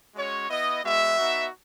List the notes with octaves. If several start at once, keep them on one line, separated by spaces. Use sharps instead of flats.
G#3 C#4 F#4 C#5
B3 E4 D#5
G#3 B3 F#4 E5
B3 D#4 F#4